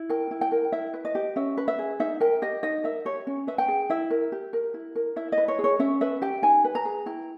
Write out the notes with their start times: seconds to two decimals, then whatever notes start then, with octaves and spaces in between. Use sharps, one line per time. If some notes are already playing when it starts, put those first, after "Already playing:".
Already playing: E4
0.09 A#4 G5
0.31 E4
0.41 G5
0.52 A#4
0.72 E4 E5
0.94 B4
1.05 D#5
1.15 G4
1.36 C#4 E5
1.57 B4
1.68 E5
1.79 G#4
2.00 D#4 E5
2.20 A#4 G5
2.42 G4 D#5
2.63 D#4 D#5
2.84 A#4 E5
3.05 G4 C#5
3.27 C#4
3.47 B4 E5
3.58 G5
3.68 G#4
3.90 E4 E5
4.11 A#4
4.32 G4
4.53 A#4
4.74 E4
4.96 A#4
5.16 E4 E5
5.32 D#5
5.38 B4
5.48 C#5
5.59 G#4
5.64 C#5
5.79 C#4 E5
6.01 B4 E5
6.22 G4 G5
6.42 D#4 G#5
6.64 B4
6.75 A#5
6.85 G#4
7.06 E4 G5